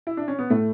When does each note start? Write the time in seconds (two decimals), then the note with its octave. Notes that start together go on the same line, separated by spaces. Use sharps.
0.07 E4
0.17 D4
0.28 C#4
0.39 B3
0.50 A2 A3